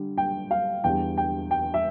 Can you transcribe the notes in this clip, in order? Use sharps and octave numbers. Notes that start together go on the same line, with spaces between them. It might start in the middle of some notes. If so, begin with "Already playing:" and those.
Already playing: D3 G3
G5
F5
E2 D3 G3 G5
G5
G5
E5